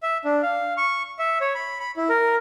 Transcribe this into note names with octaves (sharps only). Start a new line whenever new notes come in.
E5
D4
F5
C#6
E5
C#5
B5
B5
E4
A#4